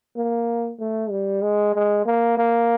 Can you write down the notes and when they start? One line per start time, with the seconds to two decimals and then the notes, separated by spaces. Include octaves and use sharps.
0.17 A#3
0.80 A3
1.11 G3
1.42 G#3
1.74 G#3
2.06 A#3
2.38 A#3